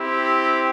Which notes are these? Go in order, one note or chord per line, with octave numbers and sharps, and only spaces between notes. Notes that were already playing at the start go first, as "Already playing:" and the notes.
Already playing: C4 E4 G4